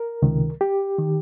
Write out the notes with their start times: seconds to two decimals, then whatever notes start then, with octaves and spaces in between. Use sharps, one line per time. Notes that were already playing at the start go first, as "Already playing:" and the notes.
Already playing: A#4
0.22 C#2 C3 D#3
0.61 G4
0.98 D#3